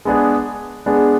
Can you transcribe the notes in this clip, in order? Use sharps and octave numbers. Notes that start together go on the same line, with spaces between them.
G#3 B3 D4 G#4
G#3 B3 D4 G#4